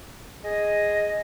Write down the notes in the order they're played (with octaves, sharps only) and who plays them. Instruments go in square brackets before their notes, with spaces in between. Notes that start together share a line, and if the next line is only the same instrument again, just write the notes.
[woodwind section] G#4 D#5